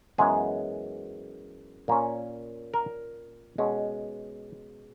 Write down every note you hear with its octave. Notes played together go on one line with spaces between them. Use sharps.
F#2 E3 G#3 B3 G#4
A#2 A#3 C#4
A#4
B2 G#3 C#4